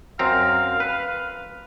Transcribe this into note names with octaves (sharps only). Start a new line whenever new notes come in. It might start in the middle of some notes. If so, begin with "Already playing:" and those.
F#2 C4 F5 A#5
B4